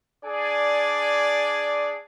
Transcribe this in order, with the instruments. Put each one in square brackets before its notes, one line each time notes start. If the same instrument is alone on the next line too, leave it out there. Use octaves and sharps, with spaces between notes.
[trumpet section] D4 G#4 D5 G#5